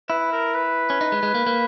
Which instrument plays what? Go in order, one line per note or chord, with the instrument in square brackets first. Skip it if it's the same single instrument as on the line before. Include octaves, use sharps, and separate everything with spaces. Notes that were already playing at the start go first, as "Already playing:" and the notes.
[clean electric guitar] E4 [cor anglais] B4
[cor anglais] A#4
B4
[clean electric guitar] C#4
D#4
G#3
G#3
A#3
A#3